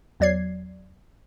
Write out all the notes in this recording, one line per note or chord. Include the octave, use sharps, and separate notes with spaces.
E2 F#3 D5 G#6 C7